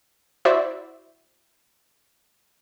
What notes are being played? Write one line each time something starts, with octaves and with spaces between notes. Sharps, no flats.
E4 F#4 C5 D5 E5